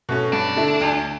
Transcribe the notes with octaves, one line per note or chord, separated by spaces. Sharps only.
B2 A3 C#4
G2 D4
D3 A3 E4
D2